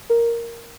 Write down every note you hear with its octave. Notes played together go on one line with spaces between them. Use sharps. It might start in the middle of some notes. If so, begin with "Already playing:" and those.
A#4